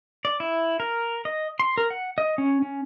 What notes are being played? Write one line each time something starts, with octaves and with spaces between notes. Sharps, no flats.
D5
E4
A#4
D#5
C6
A#4
F#5
D#5
C#4
C#4